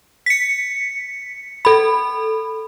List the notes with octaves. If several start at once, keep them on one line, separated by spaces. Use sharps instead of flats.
B6 C#7
A4 B5